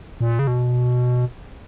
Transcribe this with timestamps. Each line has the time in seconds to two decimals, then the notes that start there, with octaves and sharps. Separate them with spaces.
0.21 A#2
0.39 C#3
0.47 B2